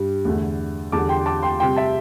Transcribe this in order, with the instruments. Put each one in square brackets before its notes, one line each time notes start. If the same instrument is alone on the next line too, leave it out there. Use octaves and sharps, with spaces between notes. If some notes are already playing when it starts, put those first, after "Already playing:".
Already playing: [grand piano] G2 G3
E2 D3 A3
E2 D3 G3 A5 D6
G5 C6
A5 D6
G5 C6
C3 G3 G5 C6
E5 A5